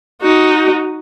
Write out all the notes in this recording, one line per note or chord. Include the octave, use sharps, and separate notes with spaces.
D#4 F#4